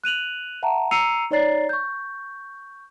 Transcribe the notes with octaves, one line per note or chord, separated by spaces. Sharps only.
F#6 D#7 F7 F#7
E5 F#5 A5 A#5
A#5 E6 C7 C#7 D#7 F7
D#4 C#5 D5 A#5 A6 C7
C#6 G6